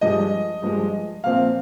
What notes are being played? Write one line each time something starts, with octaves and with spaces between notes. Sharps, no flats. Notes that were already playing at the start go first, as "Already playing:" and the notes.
G2 F3 G#3 D#5
G2 F3 G#3
A#2 F3 C4 F5